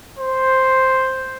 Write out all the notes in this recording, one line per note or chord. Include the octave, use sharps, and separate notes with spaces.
C5